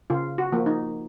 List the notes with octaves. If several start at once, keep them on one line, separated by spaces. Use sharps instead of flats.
C#3 F4
F#4
F3 A#3
D#4